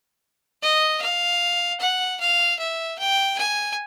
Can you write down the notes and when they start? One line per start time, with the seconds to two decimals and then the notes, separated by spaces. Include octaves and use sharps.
0.62 D#5
1.01 F5
1.80 F#5
2.20 F5
2.59 E5
2.99 G5
3.38 G#5